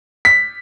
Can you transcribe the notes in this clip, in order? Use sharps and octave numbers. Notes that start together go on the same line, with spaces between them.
B6